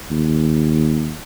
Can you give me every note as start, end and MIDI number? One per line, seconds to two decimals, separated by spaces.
0.11 1.18 39